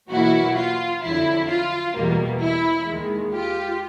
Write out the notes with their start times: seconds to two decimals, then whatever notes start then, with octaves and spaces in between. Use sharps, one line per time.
0.11 E2 B2 F#3 A#3 E4 F#4
0.56 F4
1.02 F2 D3 F#3 E4
1.49 F4
1.95 E2 B2 G3 A#3
2.41 E4
2.87 D#2 D#3 G#3
3.32 F4 G4